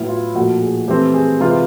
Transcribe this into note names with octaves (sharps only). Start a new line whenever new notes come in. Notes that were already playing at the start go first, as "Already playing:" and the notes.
Already playing: A2 F#3 B3 E4
F4
A#2 F3 A3 F#4
G#4
E3 A3 C4 G4
G#4
C3 E3 G#3 C4 F4
F4